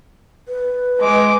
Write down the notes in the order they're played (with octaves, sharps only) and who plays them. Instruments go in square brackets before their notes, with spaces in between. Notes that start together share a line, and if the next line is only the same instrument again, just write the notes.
[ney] B4
[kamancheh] G#3 D6